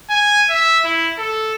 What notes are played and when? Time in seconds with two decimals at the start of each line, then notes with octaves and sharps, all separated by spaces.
0.10 G#5
0.50 E5
0.85 E4
1.19 A4